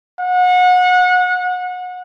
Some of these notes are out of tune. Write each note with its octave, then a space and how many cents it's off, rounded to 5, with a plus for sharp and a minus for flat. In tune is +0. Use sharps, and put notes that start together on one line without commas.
F#5 -30